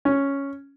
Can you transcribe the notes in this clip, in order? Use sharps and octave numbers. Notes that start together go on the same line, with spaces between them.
C#4